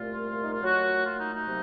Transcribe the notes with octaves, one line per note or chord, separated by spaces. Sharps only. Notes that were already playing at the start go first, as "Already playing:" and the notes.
Already playing: C2 A#2 A3 F4
D#4
F4
A#2 F#3 A3 F#4
F4
D#4
D#4
C3 F#3 A#3